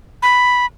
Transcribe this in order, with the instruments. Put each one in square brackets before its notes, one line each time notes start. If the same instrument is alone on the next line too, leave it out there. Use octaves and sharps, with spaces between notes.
[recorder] B5